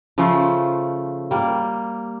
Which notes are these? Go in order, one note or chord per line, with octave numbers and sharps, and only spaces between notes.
C#3 F3 A3 C5
G3 A#3